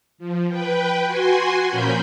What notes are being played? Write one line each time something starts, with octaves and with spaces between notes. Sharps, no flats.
F3
B4 G5
F#4 G#5 C6
A#2 F3 C#4 A#4 B5 G6